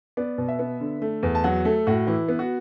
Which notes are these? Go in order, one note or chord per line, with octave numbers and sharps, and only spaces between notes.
B3 D5
B2
E5
B3
D3
A3
E2
A5
F#3 F#5
A3 A4
A2 F#4
E3 E4
B3
F#4